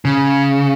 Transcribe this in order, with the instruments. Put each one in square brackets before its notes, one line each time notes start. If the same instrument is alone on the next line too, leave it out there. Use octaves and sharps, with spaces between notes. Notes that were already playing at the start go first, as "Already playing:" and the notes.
[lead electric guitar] C#3